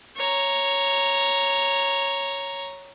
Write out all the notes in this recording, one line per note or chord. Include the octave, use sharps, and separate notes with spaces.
C#5 A#5